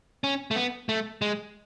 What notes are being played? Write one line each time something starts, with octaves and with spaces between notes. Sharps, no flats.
C#4
A3
B3
A3
G#3